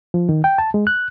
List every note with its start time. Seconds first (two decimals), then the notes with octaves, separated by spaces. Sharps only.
0.14 F3
0.29 D#3
0.44 G5
0.58 A5
0.74 G#3
0.87 F#6